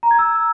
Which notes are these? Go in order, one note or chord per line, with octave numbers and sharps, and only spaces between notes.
A#5
G#6
E6